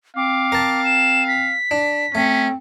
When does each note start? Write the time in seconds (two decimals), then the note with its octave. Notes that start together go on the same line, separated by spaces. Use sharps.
0.17 C4 F5 D6
0.52 A#4 A5
0.85 E7
1.28 B6
1.71 D4
2.15 A3 C4 C#4